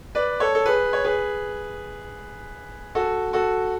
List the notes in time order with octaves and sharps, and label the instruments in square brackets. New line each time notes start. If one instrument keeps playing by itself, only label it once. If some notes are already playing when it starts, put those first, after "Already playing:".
[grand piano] B4 D5
A4 C#5
A4
G#4 B4
C#5
G#4 B4
F#4 A4
F#4 A4